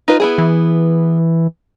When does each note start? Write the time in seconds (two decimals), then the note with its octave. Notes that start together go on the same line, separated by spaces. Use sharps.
0.08 D#4 F4 B4
0.20 B3 E4 G#4
0.38 E3